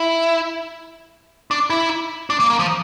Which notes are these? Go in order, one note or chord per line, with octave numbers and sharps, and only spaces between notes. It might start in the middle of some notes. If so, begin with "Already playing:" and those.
Already playing: E4
D4
E4
D4
A#3
A#3
F3